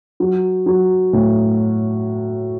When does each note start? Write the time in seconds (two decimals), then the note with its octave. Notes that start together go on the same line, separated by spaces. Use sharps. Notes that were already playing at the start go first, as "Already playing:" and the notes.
0.20 F#3
0.66 F#3
1.13 A2